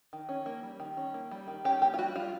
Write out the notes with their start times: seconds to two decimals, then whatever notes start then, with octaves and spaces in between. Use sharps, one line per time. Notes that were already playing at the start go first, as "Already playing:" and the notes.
0.13 D#3
0.29 C#4
0.46 A#3
0.63 G3
0.80 D#3
0.97 C#4
1.14 A#3
1.31 G3
1.48 D#3
1.64 C#4 G4
1.82 A#3 G4
1.94 F4
1.98 G3 F#4
2.16 G3 F4